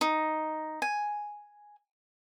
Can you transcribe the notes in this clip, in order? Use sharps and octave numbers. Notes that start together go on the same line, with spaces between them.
D#4
G#5